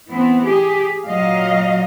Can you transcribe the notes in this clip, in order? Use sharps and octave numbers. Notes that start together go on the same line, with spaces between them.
E3 B3 C4
G4 G#4
A#2 F#3 D#5 F5